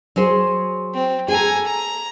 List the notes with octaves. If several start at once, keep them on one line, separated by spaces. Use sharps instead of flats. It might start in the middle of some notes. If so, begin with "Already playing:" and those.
F#3 G#4 C5
C4
G#4 A4 G#5 A#5
A#5